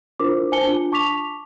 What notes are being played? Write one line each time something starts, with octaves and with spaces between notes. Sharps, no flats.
D4 E4 F4 A#4 C5 D6
C5 G#5 A5 C#7 G7
D4 F4
A5 C#6 D6 B6 F7